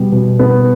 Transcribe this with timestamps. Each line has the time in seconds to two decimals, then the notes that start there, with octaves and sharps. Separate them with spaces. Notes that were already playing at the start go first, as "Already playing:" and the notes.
Already playing: B2 G3 B3
0.12 B2
0.39 B3